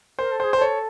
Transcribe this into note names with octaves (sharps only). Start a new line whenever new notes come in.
A#4 C5
A4
G#4 C5
A4 C5
C#5